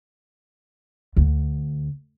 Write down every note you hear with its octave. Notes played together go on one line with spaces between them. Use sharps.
D2